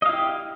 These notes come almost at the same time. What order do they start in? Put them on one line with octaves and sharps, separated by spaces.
D#5 F5 E4 G4